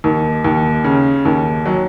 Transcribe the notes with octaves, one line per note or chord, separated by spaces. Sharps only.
D#2
D#2
C#3
D#2
F#3